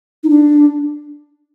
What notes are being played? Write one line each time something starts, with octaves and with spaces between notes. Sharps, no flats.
D#4
D4